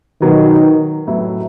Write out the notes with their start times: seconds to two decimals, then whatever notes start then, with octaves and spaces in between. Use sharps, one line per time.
0.21 B2 D#3 F#3 B3
1.07 A2 F#3 B3 E4